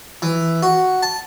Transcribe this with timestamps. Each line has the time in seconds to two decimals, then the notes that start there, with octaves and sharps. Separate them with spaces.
0.22 E3
0.63 F#4
1.02 A5